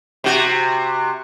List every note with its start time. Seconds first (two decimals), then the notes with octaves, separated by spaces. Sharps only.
0.24 C3 F#4